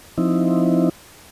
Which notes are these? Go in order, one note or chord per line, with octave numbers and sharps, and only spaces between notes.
F3 C4 D#4 E4